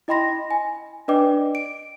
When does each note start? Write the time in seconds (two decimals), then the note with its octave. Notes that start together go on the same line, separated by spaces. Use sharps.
0.08 E4 D#5 G5 B5 C6 A#6
0.51 G#5
1.08 D4 B4 D5 D#5 G5 D6
1.55 D7